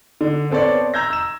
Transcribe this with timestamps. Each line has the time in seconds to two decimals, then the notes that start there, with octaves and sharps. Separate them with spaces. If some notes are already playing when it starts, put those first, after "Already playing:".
0.21 D3
0.50 B3 C4 A4 C#5 D5
0.94 A#5 E6 G6 G#6 A#6
1.10 E6 E7